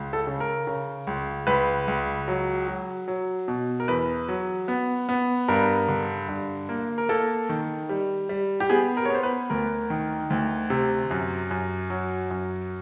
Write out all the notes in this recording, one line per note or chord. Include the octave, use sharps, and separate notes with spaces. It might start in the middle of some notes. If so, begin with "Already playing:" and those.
Already playing: C#2
A4
C#3
A#4
C#3
C#2
C#2 B4
C#2
F#3
F#3
F#3
B2
A#4
E2 B4
F#3
B3
B3
G2 A#4
D3
G2
A#3
A#4
A#3 A4
D#3
G3
G3
G4
B3 G#4
A#4
C#5
B3 C5
B4
D2 A#4
D#3
D2
C3
F#2
F#2
F#3
F#2